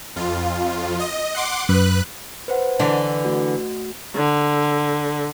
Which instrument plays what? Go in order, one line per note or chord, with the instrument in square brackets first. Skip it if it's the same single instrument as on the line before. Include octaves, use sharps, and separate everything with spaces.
[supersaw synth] F2 F4
D#5
F#5 C6 D6
[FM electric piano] F#2 [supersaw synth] B4 F#6
[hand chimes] B4 C5 F#5
[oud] D3 E3 D4
[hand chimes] A3 F#4
[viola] D3